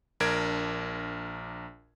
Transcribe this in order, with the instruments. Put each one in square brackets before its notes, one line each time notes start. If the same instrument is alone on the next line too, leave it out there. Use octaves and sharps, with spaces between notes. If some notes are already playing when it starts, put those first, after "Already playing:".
[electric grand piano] A#1 D4 A#4 G#6 D7